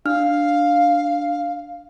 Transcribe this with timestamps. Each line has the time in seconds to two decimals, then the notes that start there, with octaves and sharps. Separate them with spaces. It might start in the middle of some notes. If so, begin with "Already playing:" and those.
0.05 D4 F5 F6